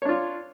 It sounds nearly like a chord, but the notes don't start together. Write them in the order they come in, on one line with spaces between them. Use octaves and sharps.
C#5 D4 F4